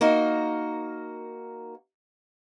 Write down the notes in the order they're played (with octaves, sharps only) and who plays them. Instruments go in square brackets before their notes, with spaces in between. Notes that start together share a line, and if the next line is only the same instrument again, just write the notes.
[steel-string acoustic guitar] A#3 D#4 F#4 A#4